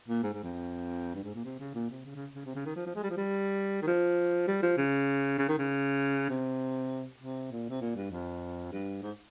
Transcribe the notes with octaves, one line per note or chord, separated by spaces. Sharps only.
A#2
G#2
G#2
F2
G2
G#2
A#2
C3
C#3
A#2
C3
C#3
C#3
C#3
C3
C#3
D#3
F3
F3
G#3
G3
F3
G3
D#3
F3
G3
F3
C#3
C#3
D#3
C#3
C3
C3
A#2
C3
A#2
G2
F2
G2
G#2